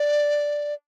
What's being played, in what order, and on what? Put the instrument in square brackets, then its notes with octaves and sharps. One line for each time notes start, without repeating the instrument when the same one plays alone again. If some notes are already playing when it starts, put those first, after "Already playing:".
Already playing: [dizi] D5